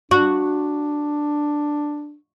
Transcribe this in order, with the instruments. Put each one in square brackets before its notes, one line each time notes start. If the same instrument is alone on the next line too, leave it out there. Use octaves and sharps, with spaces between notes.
[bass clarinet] D4 [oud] F#4